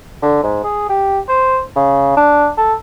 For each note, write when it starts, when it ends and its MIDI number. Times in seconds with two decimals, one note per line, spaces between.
0.22 0.39 50
0.43 0.59 44
0.64 0.89 68
0.89 1.20 67
1.29 1.61 72
1.76 2.16 49
2.17 2.49 62
2.58 2.74 69